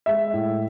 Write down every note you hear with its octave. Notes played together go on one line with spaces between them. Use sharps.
G#3 E5
A2